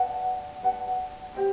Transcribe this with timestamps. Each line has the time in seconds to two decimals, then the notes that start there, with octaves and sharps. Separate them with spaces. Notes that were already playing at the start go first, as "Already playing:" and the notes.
Already playing: B4 D5 F#5 A5
0.63 B4 D5 F#5 A5
1.34 G4 C5 D#5 G5